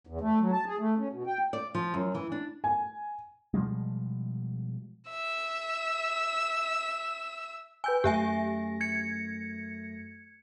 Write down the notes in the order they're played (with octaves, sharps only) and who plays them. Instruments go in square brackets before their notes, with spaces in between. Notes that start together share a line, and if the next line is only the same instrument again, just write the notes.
[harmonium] E2
A3
F#3
A5
G#4
A3
C#4
B2
G5
[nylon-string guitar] D5
F3
F#2
E3
D4
[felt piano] G#5
[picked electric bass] B2 F3 G3 G#3
[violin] E5 E6
[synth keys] B4 G5 E6 [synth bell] G#5 G6
[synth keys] F#2 A3 A#6 [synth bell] G4 E5 G#5
[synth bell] G#6 C#7